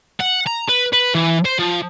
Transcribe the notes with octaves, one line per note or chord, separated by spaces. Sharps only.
F#5
A#5
B4
B4
E3
C5
F3